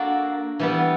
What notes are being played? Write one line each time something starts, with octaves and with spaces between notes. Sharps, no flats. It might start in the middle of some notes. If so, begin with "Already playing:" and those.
Already playing: A#3 D4 F#4 A4
E3 G3 B3